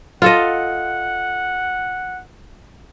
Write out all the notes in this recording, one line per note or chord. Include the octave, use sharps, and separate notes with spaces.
F4 A4 D#5 F#5